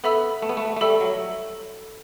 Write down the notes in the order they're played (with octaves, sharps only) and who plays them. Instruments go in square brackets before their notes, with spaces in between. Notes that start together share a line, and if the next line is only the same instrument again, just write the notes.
[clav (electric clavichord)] B3 [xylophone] A4 E5 B5 E6
[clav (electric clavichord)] A3
B3
A3
A3
[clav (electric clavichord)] G3 [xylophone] A4 E5 B5 E6
[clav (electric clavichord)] F#3